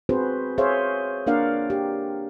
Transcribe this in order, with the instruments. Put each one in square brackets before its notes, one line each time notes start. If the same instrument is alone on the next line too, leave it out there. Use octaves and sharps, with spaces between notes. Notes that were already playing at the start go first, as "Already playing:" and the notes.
[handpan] C4 F#4 G#4 B4 C5
G#4 C5 C#5 E5 F5
A#3 D4 A#4 D5 F5 F#5
G4